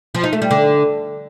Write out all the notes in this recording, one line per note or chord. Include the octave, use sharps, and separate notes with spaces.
F3
D#4
A3
G3
D3